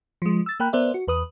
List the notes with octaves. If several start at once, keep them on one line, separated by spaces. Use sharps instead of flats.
F3 G#3
E6 A6
A#3 A#4 G5 B5 F#6
B3 A#4 C5 D5 E5
F#4
E2 B4 D#6